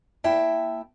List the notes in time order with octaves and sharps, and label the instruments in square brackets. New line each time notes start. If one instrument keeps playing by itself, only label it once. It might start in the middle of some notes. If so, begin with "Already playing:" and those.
[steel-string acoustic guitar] A#3 E4 E5 G5 A5